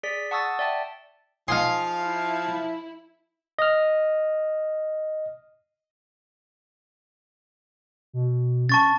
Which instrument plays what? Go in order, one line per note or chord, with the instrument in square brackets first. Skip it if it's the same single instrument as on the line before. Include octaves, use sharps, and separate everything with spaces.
[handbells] G#4 D5 B6
F#5 A5 C#6 D#6 E6 A6
D5 E5 G5 A5
[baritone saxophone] F3 [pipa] D#4 F4 G#4 [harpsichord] F5 C6
[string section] E4
[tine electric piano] D#5 F6
[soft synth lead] B2
[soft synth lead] C#4 [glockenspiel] A5 C#6 A6